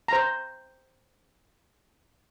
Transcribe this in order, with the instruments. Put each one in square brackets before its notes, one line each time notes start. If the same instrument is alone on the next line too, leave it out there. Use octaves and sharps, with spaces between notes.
[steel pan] C5 A#5